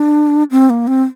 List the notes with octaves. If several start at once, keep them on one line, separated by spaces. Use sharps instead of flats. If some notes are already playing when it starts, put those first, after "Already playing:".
Already playing: D4
C4
A#3
C4